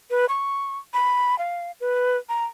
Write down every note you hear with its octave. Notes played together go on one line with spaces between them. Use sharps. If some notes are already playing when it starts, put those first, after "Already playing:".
B4
C#6
B5
F5
B4
A#5